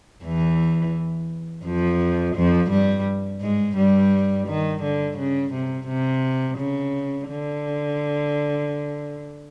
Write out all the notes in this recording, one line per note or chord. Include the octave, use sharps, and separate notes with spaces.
E2 E3
F2 F3
F2 F3
G2 G3
G#2 G#3
G2 G3
D#3
D3
C#3
C3
C3
C#3
D3